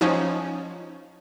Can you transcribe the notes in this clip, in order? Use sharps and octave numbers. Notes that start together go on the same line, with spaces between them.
F3 C#4 D#4